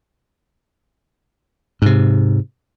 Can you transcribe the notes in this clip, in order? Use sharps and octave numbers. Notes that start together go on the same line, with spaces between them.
G#2 C3